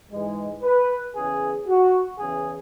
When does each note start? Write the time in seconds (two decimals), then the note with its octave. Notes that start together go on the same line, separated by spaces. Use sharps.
0.11 G#2 E3 G#3
0.63 B4
1.15 E2 C#3 E3 G#4
1.67 F#4
2.19 E2 C#3 E3 G#4